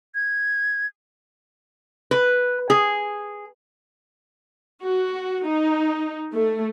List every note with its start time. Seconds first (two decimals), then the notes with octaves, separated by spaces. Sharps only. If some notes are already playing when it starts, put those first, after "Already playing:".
0.15 G#6
2.11 B4
2.70 G#4
4.83 F#4
5.48 D#4
6.33 A3